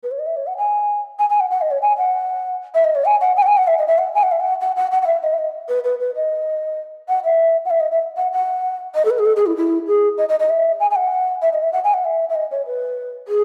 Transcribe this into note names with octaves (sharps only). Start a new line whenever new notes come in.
B4
C#5
D#5
E5
C#5
F#5
G#5
G#5
G#5
F#5
F#5
D#5
C#5
G#5
F#5
E5
D#5
C#5
G#5
F#5
G#5
F#5
G#5
F#5
E5
D#5
E5
F#5
G#5
F#5
E5
F#5
F#5
F#5
F#5
F#5
E5
D#5
E5
D#5
B4
B4
B4
D#5
F#5
E5
F#5
E5
D#5
E5
F#5
F#5
D#5
A4
B4
G#4
A4
G#4
E4
E4
G#4
D#5
D#5
D#5
E5
G#5
G#5
F#5
E5
D#5
E5
F#5
G#5
F#5
E5
E5
D#5
C#5
B4
G#4